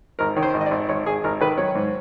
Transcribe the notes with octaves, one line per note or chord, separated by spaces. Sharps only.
G#1 A#4
D#3 C#5
C5
G#1
D#5
D5
G#1
G#1 C#5
G#1 G#4
G#1 A#4
D#3 B4
F#3 C#5
G#2